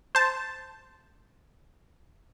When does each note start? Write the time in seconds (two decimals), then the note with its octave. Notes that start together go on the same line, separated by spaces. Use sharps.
0.15 C5 A5